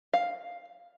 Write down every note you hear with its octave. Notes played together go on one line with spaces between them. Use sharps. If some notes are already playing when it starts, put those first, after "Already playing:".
F5